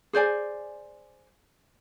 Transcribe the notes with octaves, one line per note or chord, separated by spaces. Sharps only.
G#4 C5 D5 G#5